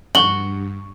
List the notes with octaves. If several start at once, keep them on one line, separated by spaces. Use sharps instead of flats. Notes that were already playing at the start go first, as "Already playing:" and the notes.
G2 F#4 C#6 F#7 G7